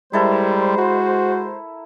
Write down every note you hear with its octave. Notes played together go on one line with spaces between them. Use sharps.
G3 G#3 E4 A4 A#4 C5
F#4